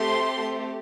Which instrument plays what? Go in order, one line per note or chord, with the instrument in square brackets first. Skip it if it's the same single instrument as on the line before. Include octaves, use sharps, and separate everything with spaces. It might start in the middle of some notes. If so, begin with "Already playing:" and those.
Already playing: [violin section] A3 C4 G4 C6